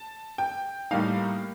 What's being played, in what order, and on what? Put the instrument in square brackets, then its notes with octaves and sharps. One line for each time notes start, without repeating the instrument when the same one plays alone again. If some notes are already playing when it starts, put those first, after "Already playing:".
Already playing: [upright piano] A5
G5
[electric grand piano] A2 G3 A#3 D#4 [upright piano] F5